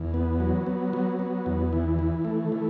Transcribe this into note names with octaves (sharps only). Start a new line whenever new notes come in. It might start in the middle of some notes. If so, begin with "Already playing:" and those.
Already playing: E2
B3
F#3
B3
F#3
B3
E2
E3
E3
A3
E3